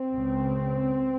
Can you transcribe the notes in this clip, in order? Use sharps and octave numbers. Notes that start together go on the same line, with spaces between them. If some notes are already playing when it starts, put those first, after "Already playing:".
Already playing: C4
C#2 C#3